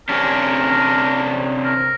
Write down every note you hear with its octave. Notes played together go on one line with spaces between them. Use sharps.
C3 C#4 D4 A#4
A#4